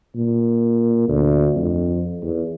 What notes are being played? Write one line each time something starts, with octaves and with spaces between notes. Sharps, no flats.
A#2
D2
F2
E2